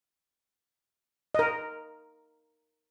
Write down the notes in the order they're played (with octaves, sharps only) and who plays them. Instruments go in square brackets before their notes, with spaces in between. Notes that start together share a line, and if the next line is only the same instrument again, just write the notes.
[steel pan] A#4 D#5